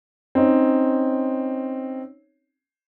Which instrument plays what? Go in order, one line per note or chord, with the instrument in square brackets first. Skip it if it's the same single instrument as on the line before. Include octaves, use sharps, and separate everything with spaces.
[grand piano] C4 C#4 D#4 C#5